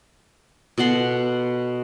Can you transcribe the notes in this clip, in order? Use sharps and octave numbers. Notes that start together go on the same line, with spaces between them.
B2 A4 F#5 C6